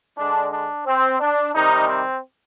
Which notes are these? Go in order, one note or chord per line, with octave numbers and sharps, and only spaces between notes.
D3 G#3 D4
D4
C4
D4
C3 D#3 G3 D#4
C4